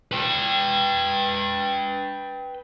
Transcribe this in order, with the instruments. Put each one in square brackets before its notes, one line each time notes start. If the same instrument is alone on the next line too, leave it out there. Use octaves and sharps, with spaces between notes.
[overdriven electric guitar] B4 G5